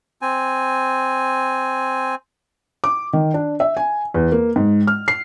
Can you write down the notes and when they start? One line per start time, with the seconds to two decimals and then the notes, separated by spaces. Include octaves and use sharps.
0.22 C4 G#5
2.84 D6
3.13 D#3
3.34 D4
3.60 E5
3.77 G#5
4.14 E2
4.32 A#3
4.56 G#2
4.87 F6
5.08 C7